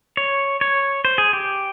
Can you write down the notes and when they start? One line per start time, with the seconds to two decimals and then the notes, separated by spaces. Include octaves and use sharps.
0.17 C#5
0.61 C#5
1.05 C5
1.18 G#4
1.33 G4